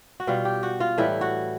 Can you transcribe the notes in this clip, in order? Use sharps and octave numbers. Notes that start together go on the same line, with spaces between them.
F#4
B2 G3 F4
G4
F#4
F4
A2 E3 G3 E4
F#4